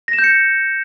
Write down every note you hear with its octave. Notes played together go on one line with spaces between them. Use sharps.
A#6
E7
G6
C#7